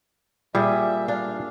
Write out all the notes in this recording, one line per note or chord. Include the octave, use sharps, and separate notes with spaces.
A#2 G3 G#4 E5
D4 F5